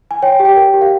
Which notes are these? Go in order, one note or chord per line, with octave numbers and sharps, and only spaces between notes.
G#5
C#5 G5
G4
G5
A#4
G4
F5